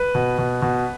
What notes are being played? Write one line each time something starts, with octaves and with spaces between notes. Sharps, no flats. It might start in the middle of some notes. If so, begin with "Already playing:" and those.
Already playing: B4
B2
B2
B2